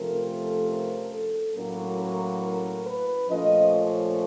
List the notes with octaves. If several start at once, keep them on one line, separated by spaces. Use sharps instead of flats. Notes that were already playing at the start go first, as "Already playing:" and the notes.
Already playing: C3 F3 A3 C#4 A#4
A4
A#4
A4
A2 F#3 A#3 C#4 A#4
A#4
A#4
B4
A#2 F3 A3 C#4 D#5
C#5